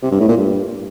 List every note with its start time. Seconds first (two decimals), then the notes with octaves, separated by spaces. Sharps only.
0.03 C3
0.11 G2
0.20 A2
0.28 A#2
0.37 G2